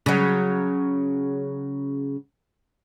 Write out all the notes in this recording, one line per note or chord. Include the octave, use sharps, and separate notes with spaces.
C#3 F#3